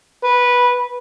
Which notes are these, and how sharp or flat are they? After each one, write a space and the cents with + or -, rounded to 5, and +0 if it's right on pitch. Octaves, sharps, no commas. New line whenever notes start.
B4 -10